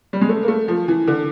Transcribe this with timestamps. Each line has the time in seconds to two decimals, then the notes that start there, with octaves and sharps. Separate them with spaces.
0.13 G3
0.21 G#3
0.29 A3
0.43 A#3
0.48 A3
0.68 F3
0.88 E3
1.07 D3